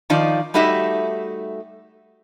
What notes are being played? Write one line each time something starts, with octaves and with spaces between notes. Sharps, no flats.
D#3 F3 D#4 F4 D5
G3 A3 D#4 F#4 G4 E5